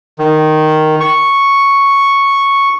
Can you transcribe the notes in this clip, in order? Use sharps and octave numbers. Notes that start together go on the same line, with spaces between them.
D#3
C#6